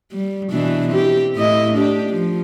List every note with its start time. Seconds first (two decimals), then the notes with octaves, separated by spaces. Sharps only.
0.12 G3
0.51 B2 E3 D4
0.88 C4 G4
1.36 A2 E4 D#5
1.74 D4 G4
2.10 F3